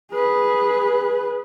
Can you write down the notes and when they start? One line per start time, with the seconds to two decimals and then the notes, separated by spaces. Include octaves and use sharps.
0.12 G#4 B4